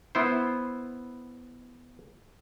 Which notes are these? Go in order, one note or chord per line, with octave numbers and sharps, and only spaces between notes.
B3 E4 C5